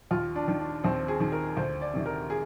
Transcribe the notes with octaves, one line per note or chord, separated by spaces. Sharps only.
D#2 F4
D4
D#3
D4
D#2 C4
G#4
D#3
A#4
D2 C5
D5
C3 D#3
A#4
G#4